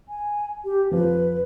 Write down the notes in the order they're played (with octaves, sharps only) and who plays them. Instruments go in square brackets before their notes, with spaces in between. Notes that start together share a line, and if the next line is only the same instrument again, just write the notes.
[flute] G#5
G4
[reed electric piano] F2 F3 [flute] B4